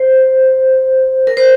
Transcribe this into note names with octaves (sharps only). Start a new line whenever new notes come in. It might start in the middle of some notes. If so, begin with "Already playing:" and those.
Already playing: C5
A#4
C5